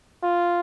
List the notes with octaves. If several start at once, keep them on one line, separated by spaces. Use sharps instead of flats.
F4